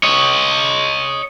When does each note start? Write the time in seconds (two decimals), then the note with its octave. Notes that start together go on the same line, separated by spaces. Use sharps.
0.03 C#5 D#5